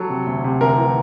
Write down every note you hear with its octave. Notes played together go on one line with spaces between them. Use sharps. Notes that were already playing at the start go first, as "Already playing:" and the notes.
Already playing: F#3 A4
C3
D2
C3
D2 A#4
E3